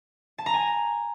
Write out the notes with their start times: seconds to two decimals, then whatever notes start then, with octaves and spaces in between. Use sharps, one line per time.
0.38 A5
0.46 A#5
0.54 G#5